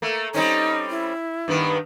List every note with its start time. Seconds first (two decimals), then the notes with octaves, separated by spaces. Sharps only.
0.02 A3 A#3
0.34 G3 C4 C#4 D#4
0.90 E4
1.48 G2 D#3 B3